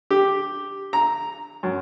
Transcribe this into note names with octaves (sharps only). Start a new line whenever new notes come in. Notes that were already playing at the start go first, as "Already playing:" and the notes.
G4
A#5
F#2